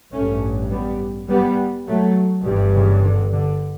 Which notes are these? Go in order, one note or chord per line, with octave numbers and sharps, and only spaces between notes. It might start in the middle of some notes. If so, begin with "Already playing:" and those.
A1 G2 A3 C#4
G3 B3
G3 B3
F#3 A3
G1 G2 E3 G3
C#3 E3
D3
D3